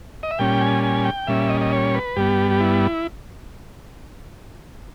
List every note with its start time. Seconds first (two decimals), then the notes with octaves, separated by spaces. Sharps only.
0.23 D#5
0.31 E5
0.39 A#2 G3 C#4 G5
0.61 G#5
0.84 G#5
1.05 G5
1.27 A#2 G3 C#4 E5
1.49 D#5
1.61 D#5
1.72 C#5
1.94 B4
2.16 G2 G3 B3 G4
2.51 G4
2.61 E4